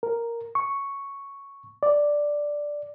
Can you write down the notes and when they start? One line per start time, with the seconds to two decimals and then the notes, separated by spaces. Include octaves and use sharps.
0.03 A#4
0.55 C#6
1.83 D5